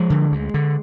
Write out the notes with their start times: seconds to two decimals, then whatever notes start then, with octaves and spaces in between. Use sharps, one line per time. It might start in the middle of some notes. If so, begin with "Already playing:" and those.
Already playing: F3 G#3
0.10 D3
0.32 D2
0.54 D3